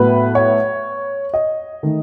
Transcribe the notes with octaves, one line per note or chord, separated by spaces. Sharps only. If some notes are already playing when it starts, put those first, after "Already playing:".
Already playing: A2 F#3 B3 B4
C#5
D#5
D#3 A3